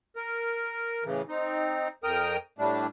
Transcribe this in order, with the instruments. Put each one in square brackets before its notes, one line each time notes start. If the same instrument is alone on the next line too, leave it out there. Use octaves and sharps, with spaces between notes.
[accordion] A#4
A2 C#3 E3
C4 D#4
F2 A#4 G5 D#6 F6
A2 G3 A3 D4